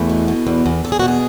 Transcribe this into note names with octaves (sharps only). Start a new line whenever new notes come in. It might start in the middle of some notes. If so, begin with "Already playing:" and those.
Already playing: E2 A3
B2
B2
E2
E2
E2 A4
G#4
B2 F#4
G#4